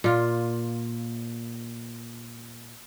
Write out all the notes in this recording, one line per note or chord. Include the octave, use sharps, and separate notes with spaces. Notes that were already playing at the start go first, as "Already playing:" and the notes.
A#2 F4